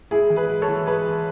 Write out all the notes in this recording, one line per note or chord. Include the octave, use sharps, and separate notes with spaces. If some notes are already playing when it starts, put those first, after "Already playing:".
G#2 E4 G#4
E3
G#4 B4
G#2
A4 C#5
E3
G#2 G#4 B4
E3